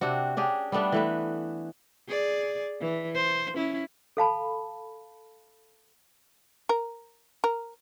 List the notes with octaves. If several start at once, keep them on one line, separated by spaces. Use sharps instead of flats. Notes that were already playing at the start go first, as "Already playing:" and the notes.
C3 C4 D4 F#4
C#4 D4 G4 G#4
G3 A3 B3 D4
E3 A3 B4
G#4 D5
E3
C5
C#4 E4
A4 F5 A5 B5
A#4
A#4